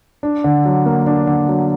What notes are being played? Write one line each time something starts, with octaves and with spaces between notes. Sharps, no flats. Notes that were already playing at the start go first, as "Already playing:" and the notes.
D4
D3
F#3
A#3
D4
D3
F#3